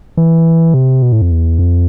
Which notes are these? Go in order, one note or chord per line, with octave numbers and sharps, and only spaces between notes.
E3
C3
B2
A2
F2
E2
F2